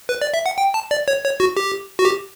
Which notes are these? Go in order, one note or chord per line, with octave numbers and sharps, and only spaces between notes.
B4
D5
E5
F#5
G5
A5
D5
C#5
C#5
F#4
G4
F#4
G4